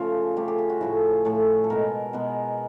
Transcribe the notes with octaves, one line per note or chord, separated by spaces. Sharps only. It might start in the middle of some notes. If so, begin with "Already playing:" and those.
Already playing: C#3 F3 A3 F4
C#3 F3 A3 G4
G4
G4
F#4
A2 F3 A3 E4
A2 F3 A3
A4
B2 G#3 B3 A#4
B2 G#3 B3